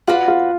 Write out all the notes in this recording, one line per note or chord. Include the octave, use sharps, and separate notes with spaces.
F4 F#4 B4 D5 F#5
F4